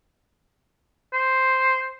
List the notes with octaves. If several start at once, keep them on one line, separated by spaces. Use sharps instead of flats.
C5